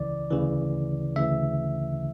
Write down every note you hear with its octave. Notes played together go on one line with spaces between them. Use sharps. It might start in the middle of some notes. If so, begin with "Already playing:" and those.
Already playing: C#2 C#3 E3 D5
D2 C#3 E3
D2 C#3 E3 E5